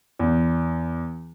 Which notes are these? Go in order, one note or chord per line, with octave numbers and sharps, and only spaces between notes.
E2